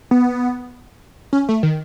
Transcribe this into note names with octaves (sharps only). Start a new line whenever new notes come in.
B3
C#4
A3
D#3